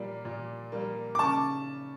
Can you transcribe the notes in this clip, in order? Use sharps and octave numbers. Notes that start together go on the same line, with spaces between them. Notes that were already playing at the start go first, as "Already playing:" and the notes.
Already playing: A#2 G3 A#3
A#2
G3 A#3
D6
C#3 A5 C#6